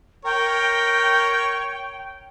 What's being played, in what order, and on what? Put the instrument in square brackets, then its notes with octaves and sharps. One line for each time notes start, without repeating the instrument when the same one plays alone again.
[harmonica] A#4 C#5 [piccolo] G5